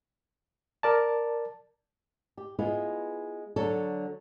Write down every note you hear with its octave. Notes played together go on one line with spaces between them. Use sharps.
A#4 D5 A5
G4
G#3 B3 E4 F4
D3 F#3 A4 C#5